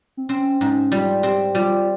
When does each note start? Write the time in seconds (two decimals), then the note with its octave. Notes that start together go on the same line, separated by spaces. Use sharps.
0.17 C4
0.29 C4 C#4
0.61 G#2 C#4
0.92 G3 F4
1.23 C4 G4
1.55 G3 F4